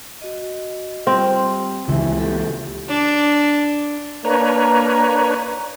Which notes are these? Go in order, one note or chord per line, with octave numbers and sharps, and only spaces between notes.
F#4 D#5
G3 C4 F4 G4
C#2 C#3 E3 E4 E5 G#5
G4 A4
D4
A#3 D4 B4 C#5 A#5